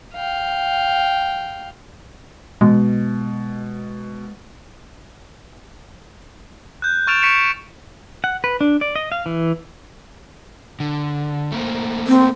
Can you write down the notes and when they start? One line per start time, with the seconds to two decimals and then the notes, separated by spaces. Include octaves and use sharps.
0.14 F5 G5
2.61 B2 G#3
6.82 F#6 G6
7.07 C#6 F6 A6 D7 E7 F7
7.21 C#6 B6 C#7 D7 E7 F7
8.24 F#5
8.44 B4
8.61 D4
8.81 D5
8.96 D#5
9.12 F5
9.26 E3
10.80 D3
11.52 A3 A#3 C5
12.08 C4